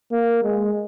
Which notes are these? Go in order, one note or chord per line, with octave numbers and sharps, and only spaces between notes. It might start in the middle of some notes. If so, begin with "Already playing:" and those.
A#3
G#3